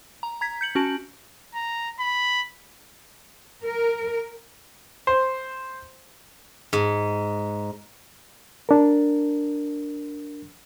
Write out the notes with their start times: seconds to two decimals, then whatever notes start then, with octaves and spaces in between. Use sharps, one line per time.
0.23 A#5
0.41 A#5 G#6 B6
0.61 G6 C#7 F#7
0.75 C#4 F#4 A5 D7 F#7
1.55 A#5
2.00 B5
3.65 A#4
5.07 C5
6.73 G#2
8.69 D4 A#4